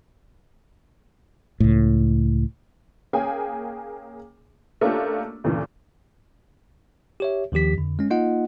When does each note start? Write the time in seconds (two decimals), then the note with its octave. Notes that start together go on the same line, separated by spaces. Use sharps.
1.60 C#2 A2
3.13 A#3 C#4 G#4 G5 G#5
4.81 A3 A#3 C#4 D4 F4 G4
5.44 D2 G2 A#2 C#3 E3
7.20 G4 C#5 E5
7.52 D#2 D#3 F3 G4 B6
7.74 F2 D3
7.99 G#3 C#4
8.10 A#3 D#4 F4 D#5 F#5